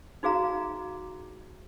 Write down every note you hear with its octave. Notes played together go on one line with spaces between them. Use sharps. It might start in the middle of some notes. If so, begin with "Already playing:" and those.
D#4 F#4 G#4 F5 A#5